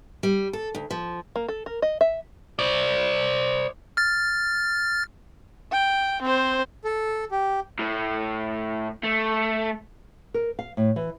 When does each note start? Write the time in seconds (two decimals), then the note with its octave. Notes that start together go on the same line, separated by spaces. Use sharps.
0.23 G3
0.53 A4
0.75 D2
0.91 F3
1.36 A#3
1.49 A4
1.66 A#4
1.82 D#5
2.01 E5
2.59 C5 D5
3.97 F6 A6
5.72 G5
6.22 C4 C5
6.84 A4
7.31 G4
7.79 A2
9.04 A3
10.34 A#4
10.59 F5
10.77 A2
10.96 E3